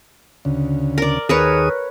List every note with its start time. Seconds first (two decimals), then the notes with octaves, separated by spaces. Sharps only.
0.45 D2 C#3
0.98 A#4 D5
1.29 D#2 G#4 A#4 B4 C#5 D#6